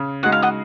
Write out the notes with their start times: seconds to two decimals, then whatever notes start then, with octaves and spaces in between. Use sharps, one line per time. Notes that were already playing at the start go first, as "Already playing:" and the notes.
Already playing: C#3
0.23 G#3 D#4 F#4 F#5
0.32 F5
0.42 D#5 F#5